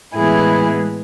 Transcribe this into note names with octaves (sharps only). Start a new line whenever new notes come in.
A2 E3 G#3 B3 E4 G#4